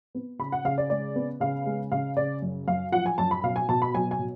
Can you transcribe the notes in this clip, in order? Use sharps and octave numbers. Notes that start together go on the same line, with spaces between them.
B3
C#3 B5
F#5
C#3 F5
D5
G#3 D5
B3
C#3 F5
G#3
C#3 F5
C#3 D5
F#2
F#2 F5
F3 F#5
G#5
F#2 A5
B5
B2 F5
G#5
B2 A5
B5
F#3 G#5
G#5
B2